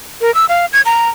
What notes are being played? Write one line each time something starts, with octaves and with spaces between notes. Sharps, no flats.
A#4
E6
F5
G#6
A#5